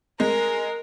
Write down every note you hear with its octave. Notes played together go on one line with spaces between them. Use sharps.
G#3 A#4